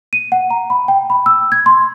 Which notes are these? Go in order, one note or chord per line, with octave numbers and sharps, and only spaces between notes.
D#7
F#5
A#5
B5
G5
B5
E6
G#6
C6